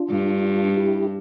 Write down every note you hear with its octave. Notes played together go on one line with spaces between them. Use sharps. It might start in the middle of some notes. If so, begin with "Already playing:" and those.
Already playing: D4 F4
G2
E4 G4